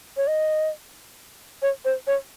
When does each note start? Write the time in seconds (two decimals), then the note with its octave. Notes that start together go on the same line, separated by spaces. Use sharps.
0.17 C#5
0.27 D#5
1.62 C#5
1.85 C5
2.07 C#5